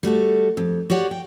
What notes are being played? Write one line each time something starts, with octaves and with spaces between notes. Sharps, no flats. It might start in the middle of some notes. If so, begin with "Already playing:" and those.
G3 A3 F#4 A4
F2
F#4 G4 C#5 D5 F#5
G5